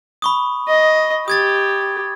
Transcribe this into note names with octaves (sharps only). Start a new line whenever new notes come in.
B5 C#6 D#6
D#5
G4 D#6 G#6 A6